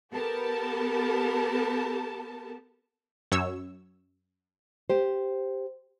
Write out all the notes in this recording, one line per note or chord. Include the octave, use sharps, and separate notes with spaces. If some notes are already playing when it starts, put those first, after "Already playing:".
B3 G4 A4 A#4 A5
F#2 C#5 E6
G4 C5